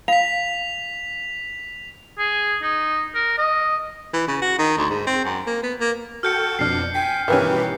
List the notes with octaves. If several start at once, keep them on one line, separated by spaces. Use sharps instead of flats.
F5 B6 F7
G#4
D#4
A#4
D#5
E3
C#3
F#4
D#3
D2
G#2
C4
F#2
A#3
B3
A#3
F#4 A4 G5 F6 G6 C#7
F2 B2 D4 F6 C7
G5 G#5 B6
G2 B2 D#3 E3 C#4 G4 B4